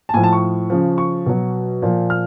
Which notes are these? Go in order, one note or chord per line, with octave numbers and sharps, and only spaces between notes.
A5
A2 F3 G#5
A5
C#6
C#3 F3
C#6
B2 F#3
A#2 F3
F6